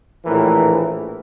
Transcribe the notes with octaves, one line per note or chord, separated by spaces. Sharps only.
A#1 A2 E3 A#4